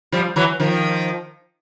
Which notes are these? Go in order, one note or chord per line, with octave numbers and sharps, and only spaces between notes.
F3 G3
E3 F#3
D#3 F3